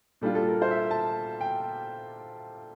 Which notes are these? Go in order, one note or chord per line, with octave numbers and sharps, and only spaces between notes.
A#2 G3 D4 F4 A4
A4
A#4
C5
E5
A5
G5